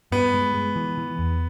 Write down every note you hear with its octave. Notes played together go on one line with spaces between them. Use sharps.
G2 B3
G#3
G#3
E3
E3
E2